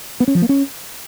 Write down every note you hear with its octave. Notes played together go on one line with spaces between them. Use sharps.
B3
C#4
F3
A#3
C#4